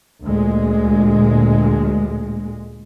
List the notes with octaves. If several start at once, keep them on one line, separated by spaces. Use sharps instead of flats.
D2 A#2 G#3